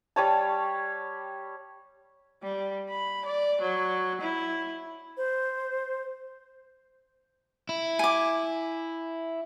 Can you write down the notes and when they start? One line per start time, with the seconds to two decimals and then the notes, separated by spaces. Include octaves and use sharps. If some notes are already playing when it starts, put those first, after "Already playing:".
0.16 G3 C#5 A5
2.43 G3
2.90 B5
3.25 D5
3.61 F#3
4.21 E4
5.17 C5
7.69 E4
7.99 G#5 D6